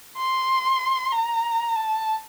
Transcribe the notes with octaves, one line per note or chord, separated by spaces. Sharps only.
C6
A#5
A5